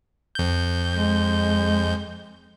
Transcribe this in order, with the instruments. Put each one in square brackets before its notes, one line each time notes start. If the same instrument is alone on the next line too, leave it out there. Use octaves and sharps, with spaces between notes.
[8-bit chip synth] F2 G6
[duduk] G#3